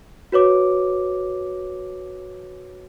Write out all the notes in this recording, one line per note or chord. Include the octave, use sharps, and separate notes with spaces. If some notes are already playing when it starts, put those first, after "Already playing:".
F#4 B4 C#5 D6